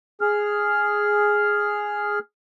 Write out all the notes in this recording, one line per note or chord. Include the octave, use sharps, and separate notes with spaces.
G#4 F6